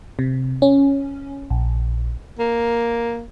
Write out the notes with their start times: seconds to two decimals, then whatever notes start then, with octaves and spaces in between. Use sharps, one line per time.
0.19 C3
0.62 C#4
1.50 A#1
2.39 A#3